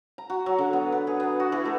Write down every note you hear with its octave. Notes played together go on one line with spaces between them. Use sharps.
A#5
F#4
F#3
D3
B3
B4
G#4
B3
F#4
E3
A3